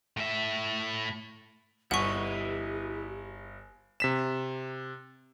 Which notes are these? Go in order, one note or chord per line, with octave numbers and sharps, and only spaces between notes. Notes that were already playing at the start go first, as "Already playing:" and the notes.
A2 E5
G1 E4 G4 B4 D#5 F#5 C#6
C3 B6 E7